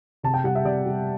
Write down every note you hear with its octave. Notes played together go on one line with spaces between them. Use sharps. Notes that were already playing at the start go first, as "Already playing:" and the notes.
C3 A5
G5
G3 F#5
E5
C3 D5
G3